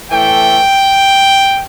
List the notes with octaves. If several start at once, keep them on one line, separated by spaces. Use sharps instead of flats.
A2 E3 A3 G5